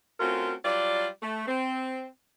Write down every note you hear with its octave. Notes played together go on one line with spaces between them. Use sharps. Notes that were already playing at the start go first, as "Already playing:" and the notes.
A3 C4 C#4 F4 F#4 A#4
F#3 G3 F4 D5
A3
C4